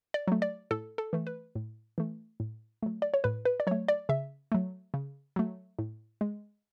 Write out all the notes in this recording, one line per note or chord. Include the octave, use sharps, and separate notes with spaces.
D5
F#3 A3
D5
A2 A4
A4
E3 A3
B4
A2
E3 A3
A2
F#3 A3
D5
C#5
A2 B4
B4
D5
F#3 A3 C#5
D5
C#3 E5
F#3 A3
C#3
F#3 A3
A2
G#3